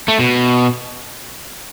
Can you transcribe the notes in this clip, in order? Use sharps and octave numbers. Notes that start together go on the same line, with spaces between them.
A3
B2